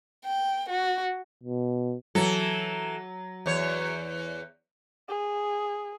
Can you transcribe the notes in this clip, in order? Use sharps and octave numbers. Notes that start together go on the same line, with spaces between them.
G5
F#4
B2
E3 F#3 A4
E2 C#5
G#4